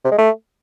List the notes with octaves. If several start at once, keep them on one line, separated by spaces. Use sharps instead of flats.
C3
G#3
A3